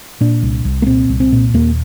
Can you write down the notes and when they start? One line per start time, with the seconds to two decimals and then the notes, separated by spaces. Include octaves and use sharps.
0.21 A#2 D4
0.43 C2
0.65 C2
0.82 A#3
0.87 A#2 C4
1.09 C2
1.20 C4
1.32 A#2
1.54 D#2 A#3